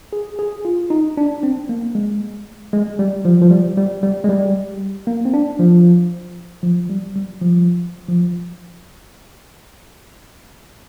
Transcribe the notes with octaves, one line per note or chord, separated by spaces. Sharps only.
G#4
G#4
F4
D#4
D4
C4
A#3
G#3
G#3
G3
F3
F3
G3
G3
G3
G#3
G3
A#3
C4
D4
F3
F3
G3
G3
F3
F3